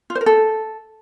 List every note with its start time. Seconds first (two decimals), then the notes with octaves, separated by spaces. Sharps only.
0.10 F4
0.15 C5
0.21 A#4
0.26 A4